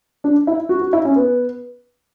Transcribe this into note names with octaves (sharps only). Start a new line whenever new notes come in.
D4
E4
F#4
F#4
E4
C#4
B3